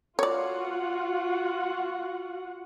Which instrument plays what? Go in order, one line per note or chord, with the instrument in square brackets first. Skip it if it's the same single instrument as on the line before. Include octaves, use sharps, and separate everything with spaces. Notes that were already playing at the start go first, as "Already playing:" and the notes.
[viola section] F4 F#4 F#5 [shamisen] C#5 D5